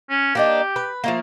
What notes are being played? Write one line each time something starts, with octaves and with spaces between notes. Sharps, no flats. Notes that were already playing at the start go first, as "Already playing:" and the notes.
C#4
A#3 D4 D#4 G4
B4
F3 A3 A#3